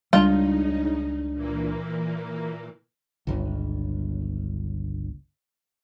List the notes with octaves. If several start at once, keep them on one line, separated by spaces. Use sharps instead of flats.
C#2 C#3 G3 D4 D#4 F4
A#2 E3 A#3
G1 C#2